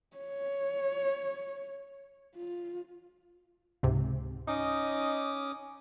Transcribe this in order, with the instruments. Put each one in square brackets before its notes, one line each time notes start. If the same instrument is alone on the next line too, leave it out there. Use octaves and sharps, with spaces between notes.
[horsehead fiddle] C#5
F4
[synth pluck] C#2 G#2 C3
[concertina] C#4 D6 D#6 [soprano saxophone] D#4